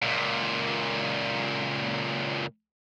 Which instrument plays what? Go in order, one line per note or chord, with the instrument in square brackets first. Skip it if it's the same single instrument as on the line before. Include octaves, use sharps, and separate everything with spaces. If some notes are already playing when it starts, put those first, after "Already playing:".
[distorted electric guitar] C#2 A#2